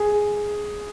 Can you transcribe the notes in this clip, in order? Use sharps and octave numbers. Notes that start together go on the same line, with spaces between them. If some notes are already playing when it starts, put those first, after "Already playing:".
Already playing: G#4